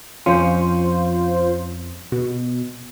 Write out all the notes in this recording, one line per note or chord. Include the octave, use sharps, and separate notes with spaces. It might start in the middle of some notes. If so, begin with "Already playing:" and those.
F2 F3 C#4 F4 C5
B2